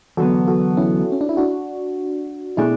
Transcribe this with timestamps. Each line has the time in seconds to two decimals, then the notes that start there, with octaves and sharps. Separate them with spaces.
0.17 E2 D3 F#3 B3 F#4 A4
0.48 F#4 A4
0.77 C#4 E4
1.12 C#4
1.21 D4
1.29 E4
1.37 D4 F#4
2.57 B2 A3 D4 E4 G#4